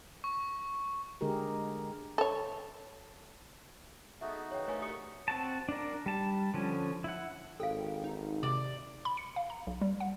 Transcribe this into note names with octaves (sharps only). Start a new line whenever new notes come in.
C#6
D3 G#3 G4 G#4 A#4
A4 C#5
G#3 A3 B3 D#4 F#4 E5
C#3 E3 C#5 G5
A#2 D3 A3 B4 C#5 G#5
G4 D#6 C#7
C4 F#4 A5
D4 A#4
G3 A5
D3 F3 C#4
E4 F#5
G#1 A4 F5 G5
D#4
C3 D5
B5
C#7
F5
A#5
B1
G3
F#5